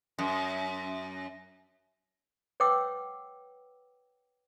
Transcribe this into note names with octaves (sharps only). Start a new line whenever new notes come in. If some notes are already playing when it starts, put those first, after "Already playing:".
F#2
B4 C#5 F#5 G5 D6 E6